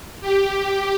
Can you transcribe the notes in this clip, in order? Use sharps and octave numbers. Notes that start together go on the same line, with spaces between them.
G4